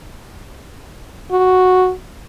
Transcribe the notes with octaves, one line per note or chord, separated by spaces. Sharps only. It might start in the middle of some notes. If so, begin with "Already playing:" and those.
F#4